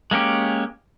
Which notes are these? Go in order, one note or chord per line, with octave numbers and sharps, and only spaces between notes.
G#3 A#3 C#4 G4